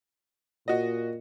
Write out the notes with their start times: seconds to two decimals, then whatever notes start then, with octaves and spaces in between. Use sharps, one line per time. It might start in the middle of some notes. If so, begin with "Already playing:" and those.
0.68 A#2 F#4 D#5